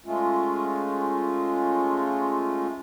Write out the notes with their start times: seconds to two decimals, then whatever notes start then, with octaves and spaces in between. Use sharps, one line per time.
0.06 G#3 A3 C#4 F4